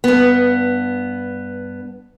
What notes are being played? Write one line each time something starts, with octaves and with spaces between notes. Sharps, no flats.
G2 B3